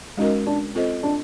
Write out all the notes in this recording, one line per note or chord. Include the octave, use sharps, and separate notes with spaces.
G#3 C#4 D#4 F#4 A#4
D4
C4 F4 A4 C5 D#5
D4